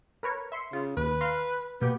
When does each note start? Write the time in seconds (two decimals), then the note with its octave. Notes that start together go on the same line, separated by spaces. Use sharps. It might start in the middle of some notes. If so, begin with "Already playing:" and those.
0.23 A#4 B4 C#5
0.52 E5 C6 C#7
0.73 C#3 F4
0.97 D#2 B4
1.21 F5 A#5 C6
1.81 B2 A#3 B3 G4